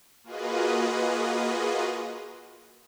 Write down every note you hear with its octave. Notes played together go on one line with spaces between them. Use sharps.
A#3 F4 F#4 G#4 B4 D#5